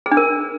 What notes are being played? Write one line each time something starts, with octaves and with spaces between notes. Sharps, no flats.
G#4
D4
A#4